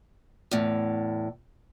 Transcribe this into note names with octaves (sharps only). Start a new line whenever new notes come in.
E2 A2